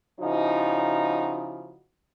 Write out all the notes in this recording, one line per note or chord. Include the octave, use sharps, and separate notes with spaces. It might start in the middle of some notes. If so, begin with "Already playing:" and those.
C#3 F3 D#4 E4 F#4